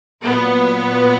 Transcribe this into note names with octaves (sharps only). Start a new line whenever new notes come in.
A#2 F#3 B3